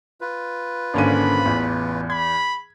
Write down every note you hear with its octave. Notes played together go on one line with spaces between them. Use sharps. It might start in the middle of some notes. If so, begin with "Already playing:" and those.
F4 B4
G#1 D3 A#3 C#4 D4 B5 D#7
A1 E2
B5 G#6